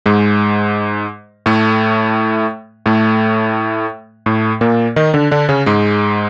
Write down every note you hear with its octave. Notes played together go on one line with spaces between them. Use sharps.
G#2 G#3
A2 A3
A2 A3
A2 A3
A#2 A#3
D#3 D#4
D3 D4
D3 D4
C#3 C#4
G#2 G#3